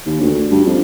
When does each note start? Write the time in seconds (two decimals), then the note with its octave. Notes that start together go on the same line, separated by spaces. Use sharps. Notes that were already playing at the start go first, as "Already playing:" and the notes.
0.06 D#2
0.20 D2
0.51 G2
0.66 F2